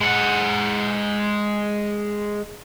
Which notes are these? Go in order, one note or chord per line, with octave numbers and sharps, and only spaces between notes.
G#3 F#5